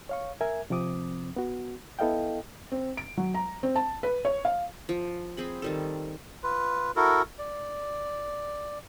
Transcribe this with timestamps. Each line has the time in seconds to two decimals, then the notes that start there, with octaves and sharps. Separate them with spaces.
0.09 C#5 F5 C#6
0.41 A#4 E5 G#5 G#6
0.70 C3 F3 C4 D6 D#6
1.36 B3 F#4
1.99 B3 E4 A4 D#5 F5 G5
2.72 C4
2.97 D7
3.17 F#3
3.34 A#5
3.63 C4
3.76 A5
4.03 B4
4.25 C#5
4.45 F5
4.89 F3
5.37 C4 G#4 B5
5.62 D#3 G3 A4
6.43 F4 B4
6.96 E4 F#4 A4 A#4
7.39 D5